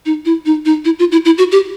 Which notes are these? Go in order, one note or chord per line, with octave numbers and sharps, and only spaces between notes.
D#4
E4
D#4
D#4
E4
F4
E4
E4
F#4
G4